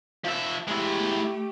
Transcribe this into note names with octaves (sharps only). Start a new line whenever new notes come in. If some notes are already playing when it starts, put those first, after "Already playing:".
F3 E5
G#3 A3 E4 G4